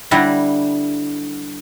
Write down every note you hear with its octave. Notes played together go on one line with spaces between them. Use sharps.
D3 G3 E4 F#5 A#5 B5